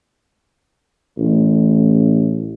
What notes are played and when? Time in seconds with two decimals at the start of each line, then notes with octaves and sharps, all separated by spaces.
1.18 A1